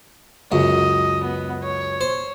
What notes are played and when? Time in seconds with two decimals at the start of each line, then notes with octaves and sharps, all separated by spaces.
0.52 C#2 F#2 D#5
1.24 B3
1.64 C#5
2.01 C5